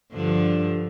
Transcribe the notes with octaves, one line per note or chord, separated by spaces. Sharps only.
G2 D3 F3